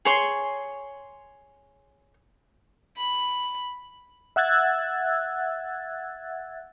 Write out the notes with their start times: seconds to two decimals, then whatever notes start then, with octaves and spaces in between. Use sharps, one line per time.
0.05 G#4 C#5 C6
2.97 B5
4.36 E5 F#5 E6 F#6 G#6 A6